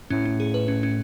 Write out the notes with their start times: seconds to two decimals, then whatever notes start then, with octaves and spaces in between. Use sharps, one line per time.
0.10 A2 C#4
0.25 C#4
0.40 G#4
0.54 B4
0.68 C#4
0.83 C#4